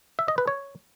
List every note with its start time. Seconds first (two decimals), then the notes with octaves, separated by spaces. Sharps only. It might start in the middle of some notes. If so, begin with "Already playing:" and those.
0.19 E5
0.28 D#5
0.38 B4
0.47 C#5